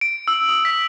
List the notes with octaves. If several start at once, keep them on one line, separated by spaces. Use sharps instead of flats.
D7
E6
D#6
B6